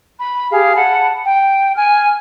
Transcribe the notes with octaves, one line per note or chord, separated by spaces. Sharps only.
B5
G4 G#4 F5
F#5 A5 B5
G5
G#5 F6